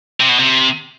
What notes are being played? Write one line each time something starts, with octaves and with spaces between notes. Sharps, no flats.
C3
B2
C3